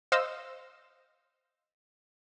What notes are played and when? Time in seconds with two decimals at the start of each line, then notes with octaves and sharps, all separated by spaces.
0.12 C5 D#5 F5 E6 F6